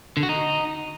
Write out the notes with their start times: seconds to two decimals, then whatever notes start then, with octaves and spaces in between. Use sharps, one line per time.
0.17 D3
0.23 F#4
0.29 D#4